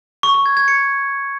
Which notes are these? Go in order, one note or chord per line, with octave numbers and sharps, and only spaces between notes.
C#6
C#6
G#6
G#6
C#7